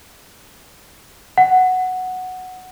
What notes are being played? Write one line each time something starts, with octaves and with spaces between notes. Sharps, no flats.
F#5